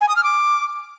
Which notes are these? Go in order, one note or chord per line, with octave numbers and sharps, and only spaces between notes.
G#5
D#6
F6
D6